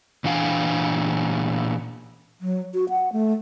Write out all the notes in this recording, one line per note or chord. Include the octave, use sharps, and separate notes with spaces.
A#2 E3 D4 F5 G5 G#5
F#3
F#4
F#5
A3